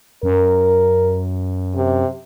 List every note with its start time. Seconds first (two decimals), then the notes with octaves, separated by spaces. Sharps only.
0.23 F#2 A#4
1.76 C3